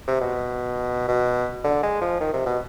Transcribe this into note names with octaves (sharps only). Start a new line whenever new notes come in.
C3
B2
B2
D3
G#3
F3
D#3
C3
B2